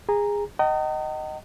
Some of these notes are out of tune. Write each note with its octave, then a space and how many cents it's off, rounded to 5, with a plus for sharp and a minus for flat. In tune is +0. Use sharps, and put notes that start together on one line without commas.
G#4 -20 A#5 +0
D#5 +0 G5 -45 A#5 -40